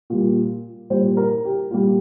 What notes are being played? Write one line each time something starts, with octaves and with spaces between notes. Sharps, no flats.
A#2 G3
A#2 G3 C5
A#4
G4
A#2 G3 F4